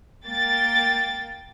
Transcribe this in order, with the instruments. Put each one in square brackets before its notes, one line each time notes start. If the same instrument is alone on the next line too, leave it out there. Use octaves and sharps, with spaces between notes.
[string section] A#3 G5 A6